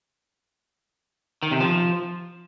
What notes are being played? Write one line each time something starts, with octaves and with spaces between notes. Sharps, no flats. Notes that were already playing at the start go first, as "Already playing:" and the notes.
D#3
C3
F3